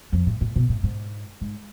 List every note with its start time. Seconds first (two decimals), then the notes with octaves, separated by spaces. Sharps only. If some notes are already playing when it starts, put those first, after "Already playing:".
0.12 F2
0.27 A2
0.41 A2
0.56 B2
0.69 A2
0.83 G#2
1.41 G#2